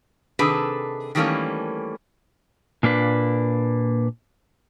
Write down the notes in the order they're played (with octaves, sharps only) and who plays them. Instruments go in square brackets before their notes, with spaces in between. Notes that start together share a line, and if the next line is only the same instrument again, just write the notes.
[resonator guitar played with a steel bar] C3 D#3 D4 G#4 A4 B4
D#3 E3 G3 A3 A#3 C#4
[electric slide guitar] A#2 A#3 D4 B4